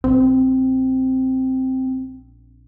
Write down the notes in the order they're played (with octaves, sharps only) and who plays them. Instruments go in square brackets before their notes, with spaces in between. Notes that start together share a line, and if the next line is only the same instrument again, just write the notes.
[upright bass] A#1 [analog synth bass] C4